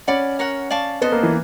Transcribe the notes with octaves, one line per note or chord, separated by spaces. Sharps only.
C#4 D5 F#5 B5 D6
A#4 C#5 F#5
D5 F5 A5 C#6
B3 A4 C5 D#5
A#3
E3